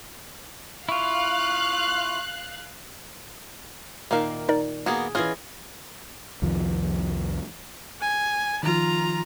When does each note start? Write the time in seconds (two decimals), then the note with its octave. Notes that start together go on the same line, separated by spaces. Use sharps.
0.89 E4 F4 F5 C#6 F#6
4.11 A#2 D#3 A#3 E5 F5
4.49 D#4 A#4 D5
4.86 A#3 B3 F#4 G#4
5.15 E3 C#4 F4 G#4 D#5 F6
6.42 C2 F2 D#3 F3
8.01 G#5
8.63 D#3 F3 F4 A#5